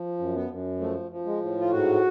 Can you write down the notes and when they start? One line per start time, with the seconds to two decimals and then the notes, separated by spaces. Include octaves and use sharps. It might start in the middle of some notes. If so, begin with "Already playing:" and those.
Already playing: F3
0.19 F#2
0.35 B3
0.50 F#2
0.80 F3 A3
1.11 F3
1.26 G#3
1.41 A2
1.61 F4
1.71 G#2 F#4